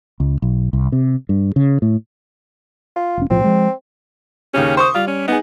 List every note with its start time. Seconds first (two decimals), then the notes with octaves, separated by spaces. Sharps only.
0.20 C#2
0.42 B1
0.73 C2
0.92 C3
1.29 G2
1.56 C#3
1.82 A2
2.96 F4
3.18 E1 C#4
3.30 B1 A2 F3 C4
3.44 F3 G#3
4.54 D#2 C#3 C#4 G4
4.77 C5 C6 C#6 D#6
4.95 G3 F4
5.07 C#4
5.28 B3 D#4 G#4